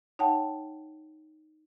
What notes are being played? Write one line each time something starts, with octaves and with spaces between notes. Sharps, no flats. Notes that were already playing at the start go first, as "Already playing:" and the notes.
D#4 C#5 F#5 G5 A5